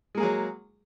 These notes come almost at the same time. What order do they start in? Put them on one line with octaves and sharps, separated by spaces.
G#3 A#3 G#4 F#3